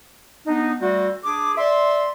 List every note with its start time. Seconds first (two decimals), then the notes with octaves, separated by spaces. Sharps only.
0.47 B3 D4 D#4
0.80 G3 A3 C4 F#4
1.25 D4 G#4 D6
1.58 D5 E5 C6